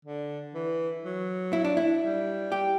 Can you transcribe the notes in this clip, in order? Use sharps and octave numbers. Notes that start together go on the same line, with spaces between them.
D3
E3
F#3
E4
D4
E4
G3
G4